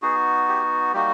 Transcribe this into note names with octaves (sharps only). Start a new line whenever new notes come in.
B3 D#4 F#4 G#4
G4
G3 A#3 D#4 F#4 G4